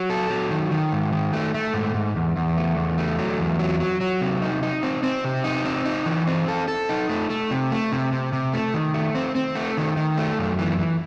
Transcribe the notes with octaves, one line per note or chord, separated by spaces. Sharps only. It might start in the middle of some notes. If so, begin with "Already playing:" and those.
Already playing: F#3
A4
F#3
D#3
D#3
G#2
D#3
A3
A3
G#2
G#2
E2
E2
A3
E2
A3
F#3
E2
F#3
F#3
F#3
C3
D#4
D#4
C4
C4
C3
D#4
C4
D#4
E3
C4
A4
A4
D#4
A3
A3
C3
A3
C3
C3
C3
A3
D#3
A3
C4
C4
A3
D#3
D#3
A3
F#2
E3
E3